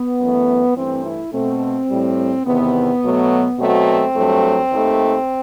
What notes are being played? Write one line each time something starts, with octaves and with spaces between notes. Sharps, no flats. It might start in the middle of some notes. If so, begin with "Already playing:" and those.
Already playing: B3
F#2 E3 A3
G2 E3 A3 C4
E4
B2 A3 C4
A2 G3
E2 C3 D#3 B3
B2 F#3 A3
B2 F#3 A3 C4
G2 F#3 A3
D#2 D#3 A3